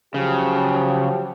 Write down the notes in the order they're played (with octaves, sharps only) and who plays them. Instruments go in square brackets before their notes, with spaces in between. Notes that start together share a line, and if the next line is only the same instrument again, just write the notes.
[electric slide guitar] C#3 [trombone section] F3 F#3 G4